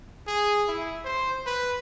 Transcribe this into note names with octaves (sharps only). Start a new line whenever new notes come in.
G#4
E4
C5
B4